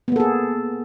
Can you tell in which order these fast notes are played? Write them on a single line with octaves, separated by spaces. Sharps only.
B3 A#3 A4 G#4